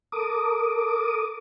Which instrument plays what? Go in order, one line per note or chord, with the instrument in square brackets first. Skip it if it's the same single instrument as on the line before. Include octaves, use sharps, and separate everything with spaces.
[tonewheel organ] A4 A#4 D6 D#6